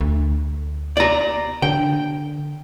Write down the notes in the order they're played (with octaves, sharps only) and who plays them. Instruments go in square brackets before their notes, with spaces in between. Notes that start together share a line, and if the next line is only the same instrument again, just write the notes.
[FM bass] D2
[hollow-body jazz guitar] D5 A#5
[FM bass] D3 [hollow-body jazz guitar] G5